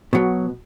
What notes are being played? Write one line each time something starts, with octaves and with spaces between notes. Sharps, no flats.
B2 F#3